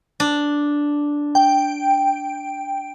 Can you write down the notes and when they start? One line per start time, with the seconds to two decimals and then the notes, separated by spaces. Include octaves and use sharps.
0.20 D4
1.35 G5